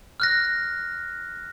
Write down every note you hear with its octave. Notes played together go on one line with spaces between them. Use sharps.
F6 F#6 A#6